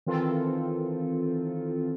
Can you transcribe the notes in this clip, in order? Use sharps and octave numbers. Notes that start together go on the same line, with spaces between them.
D#3 E3 C4 F4 A4